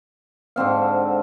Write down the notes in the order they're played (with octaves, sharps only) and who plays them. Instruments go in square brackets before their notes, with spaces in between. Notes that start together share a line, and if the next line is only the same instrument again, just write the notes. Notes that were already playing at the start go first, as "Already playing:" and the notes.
[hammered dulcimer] G#2 D3 C4 F5